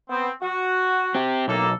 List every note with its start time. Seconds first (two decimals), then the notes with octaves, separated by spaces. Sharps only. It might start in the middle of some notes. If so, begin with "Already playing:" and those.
0.09 B3 C4
0.42 F#4
1.15 C4 G4
1.48 B1 A2 A#3 A4